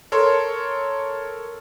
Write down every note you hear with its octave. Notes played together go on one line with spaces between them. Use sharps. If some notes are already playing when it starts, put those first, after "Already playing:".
A4 A#4 C#5 C6